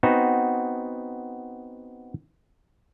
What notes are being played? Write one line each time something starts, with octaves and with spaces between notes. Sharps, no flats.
B3 C4 D#4 F#4